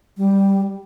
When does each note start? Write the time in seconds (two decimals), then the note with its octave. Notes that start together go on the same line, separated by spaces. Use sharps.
0.17 G3